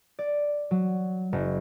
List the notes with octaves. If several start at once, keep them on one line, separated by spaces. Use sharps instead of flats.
D5
F#3
F#1